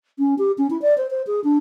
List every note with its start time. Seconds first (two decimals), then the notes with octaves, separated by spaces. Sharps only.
0.19 C#4
0.38 G4
0.58 C#4
0.70 E4
0.82 D5
0.98 C5
1.10 C5
1.27 G#4
1.44 D4